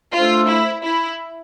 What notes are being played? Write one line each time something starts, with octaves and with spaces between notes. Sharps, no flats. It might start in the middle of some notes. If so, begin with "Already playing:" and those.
A3 D4 F4 A4 C5
E4
E4